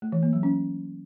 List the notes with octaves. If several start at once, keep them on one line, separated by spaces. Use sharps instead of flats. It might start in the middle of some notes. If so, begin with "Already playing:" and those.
A3
E3
A#3
F#3
C#4